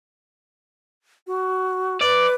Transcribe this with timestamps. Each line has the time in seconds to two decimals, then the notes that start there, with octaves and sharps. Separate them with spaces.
1.27 F#4
2.01 B4 D5